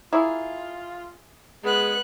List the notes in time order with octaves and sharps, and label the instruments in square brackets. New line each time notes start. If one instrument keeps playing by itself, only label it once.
[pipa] A#3 E4 G#4 [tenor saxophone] F4
[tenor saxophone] G#3 [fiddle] B3 F#6